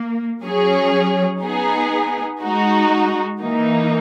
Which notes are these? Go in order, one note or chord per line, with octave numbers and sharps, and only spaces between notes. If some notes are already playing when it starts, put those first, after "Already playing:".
Already playing: A#3
F#3 C#4 G#4 C#5
B3 D#4 G#4
G#3 D#4 F#4
E3 A#3 D#4